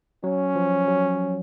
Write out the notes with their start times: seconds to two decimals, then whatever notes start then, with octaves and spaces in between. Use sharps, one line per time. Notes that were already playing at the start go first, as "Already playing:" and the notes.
0.24 F#3 C#4
0.56 F3
0.88 F#3